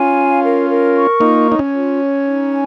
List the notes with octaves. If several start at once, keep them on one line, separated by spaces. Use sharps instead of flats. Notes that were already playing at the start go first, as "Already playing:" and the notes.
Already playing: C#4 F4 G#5
F5
A#4
A#4
C#6
A#3 D#4 F4
C#5
D#4
C#4
F4
C#5
D#4
G#5